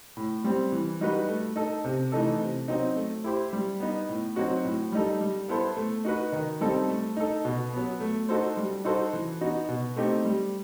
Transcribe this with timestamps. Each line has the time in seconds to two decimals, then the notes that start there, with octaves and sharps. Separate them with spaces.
0.17 A2
0.44 G3 C4
0.72 E3
1.01 G3 D#4 F#4 B4
1.28 A3
1.56 D#4 A4
1.85 C3
2.12 E3 A3 D#4 A4
2.40 C3
2.68 F#3 C4 D#4
2.96 A3
3.24 E4 G4 C5
3.53 G3
3.80 B3 D#4
4.09 A2
4.36 F#3 C4 D#4 F#4
4.65 A2
4.92 G3 D#4 A4
5.21 G3
5.48 B3 E4 A4 C5
5.77 A3
6.05 D#4 F#4 B4
6.32 D#3
6.61 G3 C4 D#4 A4
6.88 A3
7.17 D#4 A4
7.45 B2
7.73 F#3 B3
8.00 A3
8.29 D#4 F#4 A4 C5
8.57 G3
8.84 D#4 F#4 A4 C5
9.13 E3
9.41 B3 D#4 F#4
9.69 B2
9.96 A3 C4 D#4 G4
10.25 G3